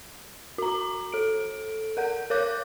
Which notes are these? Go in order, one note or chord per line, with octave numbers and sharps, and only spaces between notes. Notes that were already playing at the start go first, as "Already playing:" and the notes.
F#4 A#5
A4 D7
A#4 F#5 G6
A#4 C#5 D6 F#6 G6